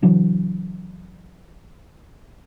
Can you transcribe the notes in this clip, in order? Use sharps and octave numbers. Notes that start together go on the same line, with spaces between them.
C#3 E3 F#3 D4